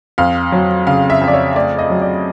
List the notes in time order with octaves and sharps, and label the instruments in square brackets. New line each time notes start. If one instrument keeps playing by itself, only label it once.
[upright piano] F2 F5
F#3
C#3 F5
E5
F2
D5
C#5
A3 D5
D#5
F#3
D5